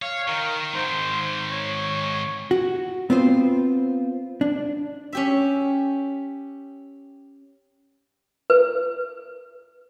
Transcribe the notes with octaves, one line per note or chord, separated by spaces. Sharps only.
C#5 F5
D#3 A#4
G#2 D#3 C5
C#5
F#4
B3 C4 F4 C5
D4
C#4 G4 E5
B4